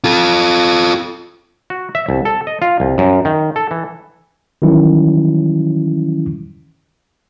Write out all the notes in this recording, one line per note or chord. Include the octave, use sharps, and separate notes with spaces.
F4 A4
F#4
E5
C2
A4
D#5
F4
C2
F#2
D#3
A4
E3
D#3 E3 F#3 G3 C#4 E4